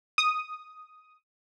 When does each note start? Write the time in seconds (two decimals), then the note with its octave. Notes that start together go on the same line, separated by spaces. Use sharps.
0.18 D#6